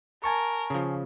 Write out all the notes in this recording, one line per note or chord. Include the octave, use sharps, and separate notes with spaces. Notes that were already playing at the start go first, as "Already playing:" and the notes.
A#4 G#5 A5 C#6
C#3 F3